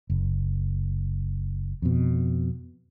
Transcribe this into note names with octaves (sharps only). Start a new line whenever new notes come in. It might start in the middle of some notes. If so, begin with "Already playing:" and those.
F#1
F2 B2